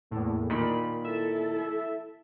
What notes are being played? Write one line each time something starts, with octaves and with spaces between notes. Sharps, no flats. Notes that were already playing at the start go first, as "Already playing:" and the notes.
E2 A2 A#3
A#2 D#3 B5
E4 A4 E5